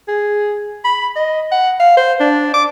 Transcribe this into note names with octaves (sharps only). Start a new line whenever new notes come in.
G#4
B5
D#5
F#5
F5
C5
D4
D6